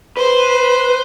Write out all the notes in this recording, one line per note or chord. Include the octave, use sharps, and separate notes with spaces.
B4 C5